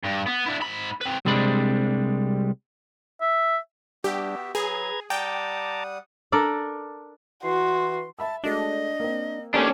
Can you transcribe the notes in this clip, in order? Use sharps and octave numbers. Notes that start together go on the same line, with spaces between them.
G2
B3
D4 E4
G#2 B5
C4 B4
C2 C3 G3 G#3 D4 B5
E5
G3 B3 D4 F#4 G4 E5
F#3 G#4 B4 A#5 G#6
G3 F#5 G5 A5 A#5 D6 D#6
D4 A4 A#4 D5
E3 F#4 C6
E5 A5 B5 E6
G#3 A3 D4 F#4 D#5
A#3 C4
A#3 C#4 D4 G4 A4 A#5